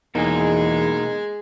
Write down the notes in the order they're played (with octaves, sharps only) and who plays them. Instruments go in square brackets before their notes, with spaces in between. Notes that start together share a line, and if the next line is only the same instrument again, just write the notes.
[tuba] E2 [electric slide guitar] B2 A#3 D#4 [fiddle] G#3 G#4